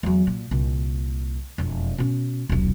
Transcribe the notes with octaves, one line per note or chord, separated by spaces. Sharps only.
E2 F#3
A#2
C2 A#2
E1 F2
B2 C#4
D#1 B1